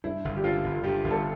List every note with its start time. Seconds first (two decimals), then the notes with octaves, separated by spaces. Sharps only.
0.04 G2 E4
0.25 G1
0.37 G4
0.44 D3 F4
0.64 G1
0.84 G2 G4
1.04 G1
1.11 A4